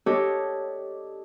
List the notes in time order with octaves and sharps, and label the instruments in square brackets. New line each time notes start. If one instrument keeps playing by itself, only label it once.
[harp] D4 G4 A4 C#5 D#5